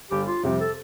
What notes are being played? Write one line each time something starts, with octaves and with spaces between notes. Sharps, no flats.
G1 G4
F4
F2 C3 G3 G4
A4